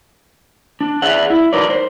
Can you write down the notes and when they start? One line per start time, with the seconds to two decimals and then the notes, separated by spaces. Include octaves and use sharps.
0.81 D4
1.02 G#4 D5 E5 F#5
1.30 E4
1.53 F#3 D#4 A#4 B4 D5
1.70 C5